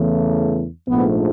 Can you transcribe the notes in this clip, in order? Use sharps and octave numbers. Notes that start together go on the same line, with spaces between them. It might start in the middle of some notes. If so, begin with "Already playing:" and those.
Already playing: E2 C#3 E3 A3
A#1 G#2 F3 A3 B3